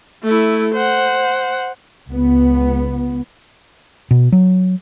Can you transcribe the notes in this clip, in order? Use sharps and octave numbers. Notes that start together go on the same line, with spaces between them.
A3 E4
C5 F#5
C#2 B3
B2
F#3